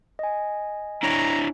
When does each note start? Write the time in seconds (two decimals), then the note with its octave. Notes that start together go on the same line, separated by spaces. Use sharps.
0.19 D#5 G#5
1.03 D4 E4 C#5 A#5